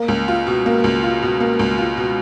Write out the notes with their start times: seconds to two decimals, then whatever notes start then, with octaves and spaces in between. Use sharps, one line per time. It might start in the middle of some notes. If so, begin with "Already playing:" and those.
Already playing: A#3
0.08 C#2
0.28 F4
0.47 B2
0.66 A#3
0.84 C#2
1.03 F4
1.22 B2
1.40 A#3
1.59 C#2
1.78 F4
1.97 B2